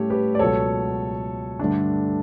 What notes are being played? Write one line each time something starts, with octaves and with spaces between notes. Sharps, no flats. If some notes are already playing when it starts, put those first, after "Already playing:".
Already playing: A2 G3 C#4 G4 A4 C#5
G4 B4
D5
C#2 B2 F#3 A4 C#5
G2 D3 A3 D4